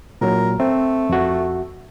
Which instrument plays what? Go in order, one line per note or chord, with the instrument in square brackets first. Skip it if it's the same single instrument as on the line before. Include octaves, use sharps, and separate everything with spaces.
[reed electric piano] A#2 F#3 [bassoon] A#4
[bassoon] A3 [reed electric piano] C4
[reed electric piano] F2 F#4